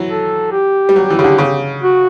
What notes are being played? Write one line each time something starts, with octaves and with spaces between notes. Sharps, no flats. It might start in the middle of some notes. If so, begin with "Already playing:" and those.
Already playing: E3 F#3
A4
G4
G3
F#3
E3
C#3
D3
C#3
F#4